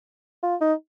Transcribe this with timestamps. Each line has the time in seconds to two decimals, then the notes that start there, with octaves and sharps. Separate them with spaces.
0.43 F4
0.61 D#4